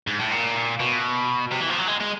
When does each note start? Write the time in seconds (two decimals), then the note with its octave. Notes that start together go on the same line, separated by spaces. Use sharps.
0.07 G#2
0.19 A2
0.31 A#2
0.80 B2
1.52 C3
1.60 E3
1.70 F3
1.79 F#3
1.87 G#3
2.00 G#3